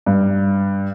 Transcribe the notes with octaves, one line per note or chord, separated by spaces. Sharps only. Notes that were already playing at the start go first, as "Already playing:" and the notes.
G2